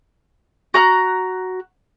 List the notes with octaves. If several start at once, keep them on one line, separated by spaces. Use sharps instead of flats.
F#4 A#5 F6 F#6